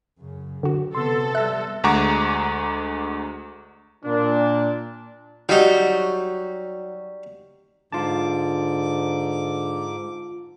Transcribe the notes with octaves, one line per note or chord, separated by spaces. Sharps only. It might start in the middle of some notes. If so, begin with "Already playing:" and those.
F#2 C#3
D3 F#4
C3 B3 A4 C6
G3 E5 F#6 A#6
D2 G#3 F#5 A#5 C#6 D6
A#2 D4
F#3 G3 D#4 F#4
G#2 D3 F4 A5 D6